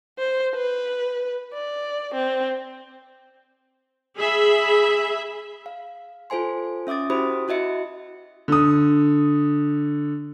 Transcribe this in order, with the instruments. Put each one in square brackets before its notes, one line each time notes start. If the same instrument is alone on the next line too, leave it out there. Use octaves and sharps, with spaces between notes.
[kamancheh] C5
B4
D5
C4
[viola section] G#4 E5 B5
[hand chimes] F5
F4 A4 C5 G#5 C6
C#4 E5 D6 D#6 A6
E4 F#4 G4 C5 B5 D#6
E4 F#4 D#5 E5 C#7
[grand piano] D3 D#6